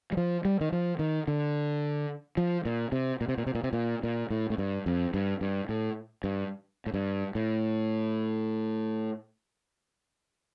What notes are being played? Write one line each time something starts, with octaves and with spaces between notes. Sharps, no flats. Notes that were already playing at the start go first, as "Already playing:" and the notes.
G3
F3
G3
D#3
F3
D#3
D3
F3
A#2
C3
A#2
C3
A#2
C3
A#2
C3
A#2
A#2
A2
A2
G2
F2
G2
G2
A2
G2
A2
G2
A2